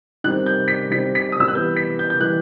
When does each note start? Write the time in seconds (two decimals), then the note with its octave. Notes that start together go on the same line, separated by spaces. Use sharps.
0.24 D#3 G3 C4 F#6
0.46 G6
0.68 B6
0.90 D#3 G3 C4 B6
1.15 B6
1.32 D#6
1.40 E6
1.48 F#6
1.55 E3 G3 B3 G6
1.76 B6
1.99 G6
2.10 G6
2.20 E3 G3 B3 F#6